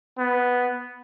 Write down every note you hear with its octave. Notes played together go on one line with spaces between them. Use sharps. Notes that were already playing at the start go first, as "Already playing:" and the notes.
B3